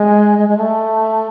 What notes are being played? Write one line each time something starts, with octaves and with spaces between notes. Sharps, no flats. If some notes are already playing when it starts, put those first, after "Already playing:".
Already playing: G#3
G#3
G#3
A3